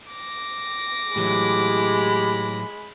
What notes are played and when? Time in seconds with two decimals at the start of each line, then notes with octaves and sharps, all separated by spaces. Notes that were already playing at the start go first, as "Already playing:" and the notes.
0.12 D6 A#6
1.16 A2 E3 F#3 G#3 G4 B5